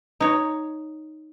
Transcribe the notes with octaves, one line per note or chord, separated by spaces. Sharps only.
D#4 C#5